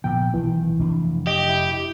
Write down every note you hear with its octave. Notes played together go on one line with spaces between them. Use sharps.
A#2 F3 B3 G5
B1 D#3 E3
F1 D4
G4 D#5
E4